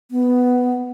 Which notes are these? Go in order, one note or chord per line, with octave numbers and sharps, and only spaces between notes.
B3